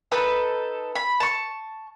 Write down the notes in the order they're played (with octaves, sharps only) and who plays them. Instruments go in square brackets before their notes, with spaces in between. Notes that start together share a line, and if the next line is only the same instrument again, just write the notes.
[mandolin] D#4 A4 B4
B5
A5 C#6